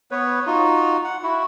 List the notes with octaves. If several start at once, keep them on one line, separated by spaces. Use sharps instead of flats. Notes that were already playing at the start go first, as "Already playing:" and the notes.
B3 B4 C#5
D#4 F4 F#4
F#5
E4 F#4